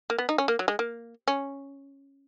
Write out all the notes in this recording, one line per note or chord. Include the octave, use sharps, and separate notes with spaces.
A#3
B3
D#4
C#4
A#3
F#3
G#3
A#3
C#4